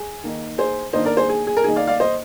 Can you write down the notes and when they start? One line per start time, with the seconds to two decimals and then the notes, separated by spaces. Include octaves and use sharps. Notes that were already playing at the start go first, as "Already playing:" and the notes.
Already playing: G#4
0.23 D#3 A#3 D#4
0.58 G#4 C5
0.93 D#3 A#3 D4 C5 D#5
1.05 A#4 D5
1.17 G#4 C5
1.29 G#4
1.47 G#4
1.57 A#4
1.64 D#3 A#3 D#4 G#4
1.76 D5 F5
1.87 D5 F5
2.00 C5 D#5